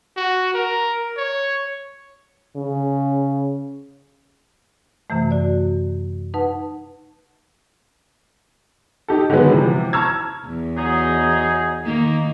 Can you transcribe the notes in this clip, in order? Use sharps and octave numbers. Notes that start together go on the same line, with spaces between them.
F#4
A#4
C#5
C#3
F#2 C3 E3 A3
F#4 D5
D#4 B4 F#5 A5
D#4 G4 A4
D3 D#3 F#3 G#3 B3
C3 E3 F3
A5 A#5 C#6 E6 F6 G#6
E2
F#3 D#4 G#4
D#3 A#3 D#4